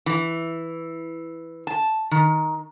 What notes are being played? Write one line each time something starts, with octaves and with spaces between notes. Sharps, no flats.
E3
A5
D#3